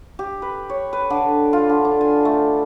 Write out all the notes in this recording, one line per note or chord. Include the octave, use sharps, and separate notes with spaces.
G4
B4
C#5
B4
D3
F4
D3
D4
G#5
A3